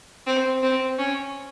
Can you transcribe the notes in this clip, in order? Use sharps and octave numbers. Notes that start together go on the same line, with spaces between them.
C4
C4
C#4